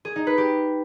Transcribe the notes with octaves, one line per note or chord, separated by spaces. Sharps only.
G#4
D#4
B4
G4